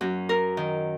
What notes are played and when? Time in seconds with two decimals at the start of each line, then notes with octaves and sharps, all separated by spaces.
0.01 F#2
0.29 A#4
0.57 D#3